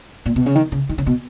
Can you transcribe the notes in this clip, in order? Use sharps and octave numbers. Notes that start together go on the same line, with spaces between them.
A#2
B2
C#3
D#3
C#3
D#3
C#3
B2